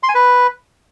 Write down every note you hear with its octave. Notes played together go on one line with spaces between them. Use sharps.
C6
G#5
B4